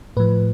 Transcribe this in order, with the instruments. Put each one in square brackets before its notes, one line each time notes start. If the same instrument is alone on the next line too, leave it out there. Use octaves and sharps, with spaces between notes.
[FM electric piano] A2 F3 B4